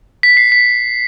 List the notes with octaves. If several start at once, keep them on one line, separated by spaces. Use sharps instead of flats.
B6
C7
B6